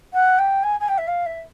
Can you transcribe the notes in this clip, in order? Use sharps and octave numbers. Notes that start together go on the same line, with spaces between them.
F#5
G5
G#5
G#5
G5
E5
F5
E5